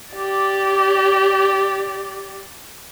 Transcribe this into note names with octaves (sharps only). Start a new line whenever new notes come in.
G4 D5